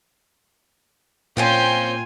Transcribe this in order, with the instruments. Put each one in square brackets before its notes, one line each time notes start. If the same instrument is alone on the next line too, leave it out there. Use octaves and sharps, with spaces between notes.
[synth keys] A#2 [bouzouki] F3 C4 C#4 [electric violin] F4 G#5 [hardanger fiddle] G5 C6